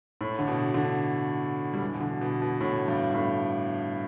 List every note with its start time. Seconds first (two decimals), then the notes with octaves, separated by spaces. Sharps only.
0.21 A2
0.39 D3
0.48 B2
0.74 D3
1.74 G3
1.82 E3
1.94 B2
2.01 D3
2.21 B2
2.42 B2
2.61 A2
2.88 G2
3.14 A2